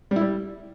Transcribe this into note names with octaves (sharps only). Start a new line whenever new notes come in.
G3
E4
G3